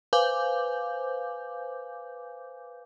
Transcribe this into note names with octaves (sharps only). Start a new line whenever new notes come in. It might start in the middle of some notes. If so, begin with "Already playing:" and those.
B4 C5 F5 G#5 D6 G6